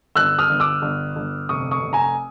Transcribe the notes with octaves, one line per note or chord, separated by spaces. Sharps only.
G1 E6 F#6
D#6 F6
G1
D6 E6
G1
G1
F1 C#6 D#6
C#6 D#6
F1
G#5 A#5